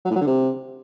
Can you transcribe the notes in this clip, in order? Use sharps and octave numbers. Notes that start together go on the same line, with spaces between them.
F#3
A2
F#3
D3
C3